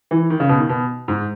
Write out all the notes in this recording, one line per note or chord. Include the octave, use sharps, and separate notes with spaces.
E3
D#3
C#3
B2
D#3
B2
G#2